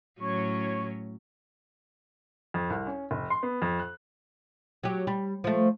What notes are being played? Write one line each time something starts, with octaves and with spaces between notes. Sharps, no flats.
A2 F#3 C#4 C#5 C#6
F2
C2
C#4
F1
C6
B3
F2
F#6
F#3 G4
G3
F3 A3